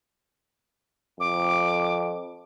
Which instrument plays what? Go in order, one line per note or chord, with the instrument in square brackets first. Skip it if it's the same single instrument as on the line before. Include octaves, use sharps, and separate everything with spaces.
[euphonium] F2 [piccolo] D6